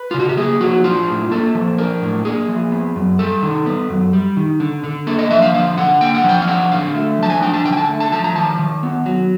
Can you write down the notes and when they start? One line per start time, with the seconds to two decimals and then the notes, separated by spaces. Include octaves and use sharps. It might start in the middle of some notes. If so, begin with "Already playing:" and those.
Already playing: B4
0.11 F4
0.14 C#3
0.20 F#4
0.29 G4
0.37 A#3 G#4
0.61 F3 F#4
0.84 D4 F4
1.08 A2
1.31 A#3 A4
1.55 F3
1.78 D4 A#4
2.02 A2
2.25 A#3 G#4
2.49 F3
2.72 B3
2.96 F#2
3.19 G3 A4
3.43 D#3
3.66 B3
3.90 F#2
4.13 G3
4.37 D#3
4.60 D3
4.84 D3
5.07 A#3 A4
5.19 D#5
5.30 F3 E5
5.42 F5
5.54 D3 F5
5.78 D3 F#5
6.01 A#3 G5
6.15 F#5
6.24 F3 G5
6.42 F5
6.48 D4 F#5
6.72 D3 F5
6.95 A3
7.19 F3 A5
7.30 G#5
7.42 D4 G5
7.54 A5
7.65 D3 G5
7.73 G#5
7.77 A5
7.89 A3
8.00 A5
8.12 F3 A5
8.24 A#5
8.36 D#3 A5
8.59 D#3
8.83 B3
9.06 F#3